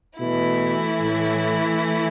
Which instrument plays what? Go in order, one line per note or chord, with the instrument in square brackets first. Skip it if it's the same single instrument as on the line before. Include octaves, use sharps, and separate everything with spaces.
[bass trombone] B2 [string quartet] E3 A3 E4
[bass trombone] A2